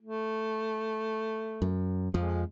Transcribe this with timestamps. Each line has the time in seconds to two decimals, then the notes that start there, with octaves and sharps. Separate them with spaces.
0.02 A3
1.62 F#2
2.14 F2 F3 G#3